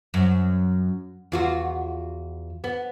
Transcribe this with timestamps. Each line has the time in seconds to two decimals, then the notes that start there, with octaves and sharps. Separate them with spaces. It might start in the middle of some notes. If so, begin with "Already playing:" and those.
0.14 F#2
1.32 E2 F4 F#4
2.64 B3